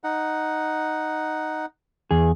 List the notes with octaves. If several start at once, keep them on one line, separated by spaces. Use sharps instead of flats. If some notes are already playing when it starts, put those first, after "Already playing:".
D#4 F#5
E2 G#4